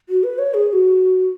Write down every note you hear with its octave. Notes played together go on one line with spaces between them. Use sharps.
F#4
B4
C#5
G#4
G#4
F#4